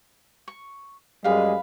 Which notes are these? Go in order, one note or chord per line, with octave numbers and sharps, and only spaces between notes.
C#6
F#2 G3 G#3 B4 F5